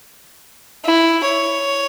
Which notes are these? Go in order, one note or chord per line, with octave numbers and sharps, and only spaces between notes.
E4
C#5